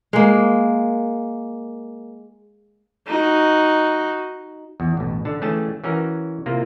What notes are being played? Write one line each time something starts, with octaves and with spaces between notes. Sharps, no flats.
G#3 A#3
D#4 F#4
E2
A1 B2
D3 A5
E3 A3 C#4 G#4 G5 A5
E3 C#4 F#4 A#4
C3 A#3 E4 F4